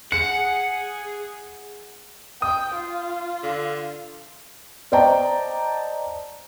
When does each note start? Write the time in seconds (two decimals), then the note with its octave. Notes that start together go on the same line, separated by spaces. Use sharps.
0.12 G#4 F#5 C#7
2.42 G5 D#6
2.75 F4
3.43 D3
4.92 C5 D5 D#5 G5 A5 A#5